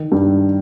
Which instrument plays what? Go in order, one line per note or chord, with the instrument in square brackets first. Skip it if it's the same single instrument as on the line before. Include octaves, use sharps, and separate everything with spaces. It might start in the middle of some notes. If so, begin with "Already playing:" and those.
Already playing: [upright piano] D#3
G2